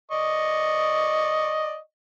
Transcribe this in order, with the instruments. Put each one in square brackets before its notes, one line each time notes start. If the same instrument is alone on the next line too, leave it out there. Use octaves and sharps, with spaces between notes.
[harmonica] D5 D#5 C#6